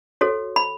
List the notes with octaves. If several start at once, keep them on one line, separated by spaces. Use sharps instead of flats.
F#4 A4 C#5
B5